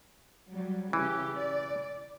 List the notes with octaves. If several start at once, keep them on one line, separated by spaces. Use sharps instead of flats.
F#3 G3
C#3 E3 G4
D5